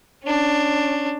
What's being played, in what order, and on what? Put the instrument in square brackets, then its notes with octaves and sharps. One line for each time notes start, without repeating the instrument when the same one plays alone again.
[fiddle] C#4 D4